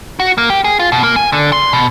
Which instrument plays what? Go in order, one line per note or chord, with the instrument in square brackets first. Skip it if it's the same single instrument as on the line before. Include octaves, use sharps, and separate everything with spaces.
[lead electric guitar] F#4
A#3
G4
G#4
F4
B2
A#3
G#5
D3
C6
B2